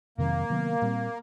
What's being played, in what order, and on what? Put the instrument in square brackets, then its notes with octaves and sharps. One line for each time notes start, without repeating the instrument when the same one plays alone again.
[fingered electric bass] F2 C3 D#3 F#3 [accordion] A#3
[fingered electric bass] C3 D#3 F#3 B3
A#2 G3 C4